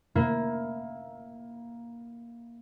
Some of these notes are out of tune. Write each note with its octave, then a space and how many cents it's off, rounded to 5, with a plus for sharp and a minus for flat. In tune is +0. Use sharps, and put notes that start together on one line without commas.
A#3 +10 E4 +0 B5 +0